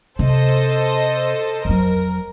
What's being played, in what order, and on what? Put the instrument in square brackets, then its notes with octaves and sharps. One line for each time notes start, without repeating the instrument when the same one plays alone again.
[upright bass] C3 [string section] A4 C5 D#5
[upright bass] F2 F#3 [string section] A#4